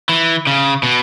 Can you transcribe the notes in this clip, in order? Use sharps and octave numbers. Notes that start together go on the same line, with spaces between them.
E3
C#3
B2